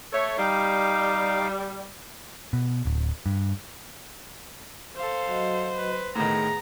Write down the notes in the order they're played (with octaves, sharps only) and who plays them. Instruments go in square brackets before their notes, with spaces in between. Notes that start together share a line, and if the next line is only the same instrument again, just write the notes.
[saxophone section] A3 A4 C#5
[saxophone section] G3 [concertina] D#4 F5 D6
[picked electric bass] B2
D1
G2
[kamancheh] A4 F5 [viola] C5
[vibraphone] F#3 F#4 D#5
[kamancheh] B4
[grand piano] A2 D#3 [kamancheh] B3 [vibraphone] G#4 [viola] A#5